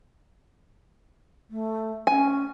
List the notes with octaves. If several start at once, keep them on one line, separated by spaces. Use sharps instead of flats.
A3
C#4 G#5